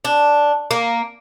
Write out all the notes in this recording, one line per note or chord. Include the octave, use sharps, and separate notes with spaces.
D4
A#3